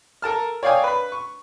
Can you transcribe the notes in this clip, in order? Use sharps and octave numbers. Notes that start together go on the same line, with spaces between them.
A4 A#4 A5 F6
C#5 D5 F5 G5 G#5 D#6
B4 B5
C#6